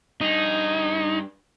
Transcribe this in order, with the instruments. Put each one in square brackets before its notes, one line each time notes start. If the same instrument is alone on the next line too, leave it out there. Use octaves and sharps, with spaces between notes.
[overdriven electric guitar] G2 G#4 [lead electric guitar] D#4